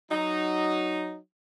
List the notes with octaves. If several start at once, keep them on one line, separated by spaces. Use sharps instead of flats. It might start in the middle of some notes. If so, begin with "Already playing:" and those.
F#3 D#4